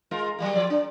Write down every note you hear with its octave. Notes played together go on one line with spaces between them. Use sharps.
G#3 F4 A#4
F#3 G3 A#3
F3 D5
D4